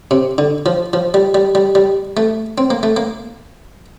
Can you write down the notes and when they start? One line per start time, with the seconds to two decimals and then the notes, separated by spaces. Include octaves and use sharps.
0.11 C3
0.38 D3
0.66 F3
0.93 F3
1.14 G3
1.34 G3
1.55 G3
1.75 G3
2.17 A3
2.58 C4
2.70 A#3
2.83 A3
2.97 A#3